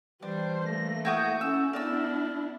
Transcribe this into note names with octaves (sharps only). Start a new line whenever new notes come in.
E3 G3 D4 C5
E3 A3 A#3 A#6
E4 F#4 D#6 G6
C#4 E4 A4 E6
B3 D4 E4 A#4 D5 E6